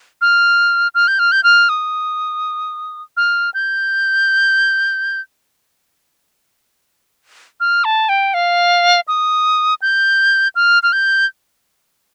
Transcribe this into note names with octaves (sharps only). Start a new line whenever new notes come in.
F6
F6
G6
F6
G6
F6
D#6
F6
G6
F6
A5
G5
F5
D#6
G6
F6
F6
G6